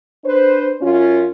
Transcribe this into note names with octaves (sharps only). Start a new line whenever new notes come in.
D4 B4 C5
F#2 C#4 F4